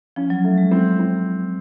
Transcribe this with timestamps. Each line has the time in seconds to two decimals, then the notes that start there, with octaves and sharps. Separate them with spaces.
0.16 F3 C#4
0.30 F#3
0.44 A3
0.58 G#3
0.71 C4
0.99 C4